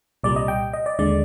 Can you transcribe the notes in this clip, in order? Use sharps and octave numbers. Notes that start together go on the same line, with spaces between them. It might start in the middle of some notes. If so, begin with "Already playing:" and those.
C2 A#2 G3 D5
D#5
G5
D#5
D5
D#2 D3 G#3 D5